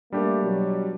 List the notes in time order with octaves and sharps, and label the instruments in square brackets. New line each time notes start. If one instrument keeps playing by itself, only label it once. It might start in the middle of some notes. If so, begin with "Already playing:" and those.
[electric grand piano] G3 D4 G4 [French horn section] A3 A#3
[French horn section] B2 F#3